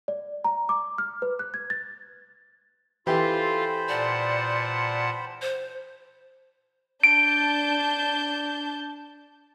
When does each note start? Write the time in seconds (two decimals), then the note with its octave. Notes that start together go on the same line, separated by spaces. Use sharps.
0.08 D5
0.44 A#5
0.69 D6
0.98 F6
1.22 B4
1.39 F#6
1.54 G#6
1.70 A6
3.07 E3 F4 G4 A4 C5 F5 G5 B5
3.89 A#2 D5 F#5 A5
5.42 C5
7.04 D4 A5 G6 D7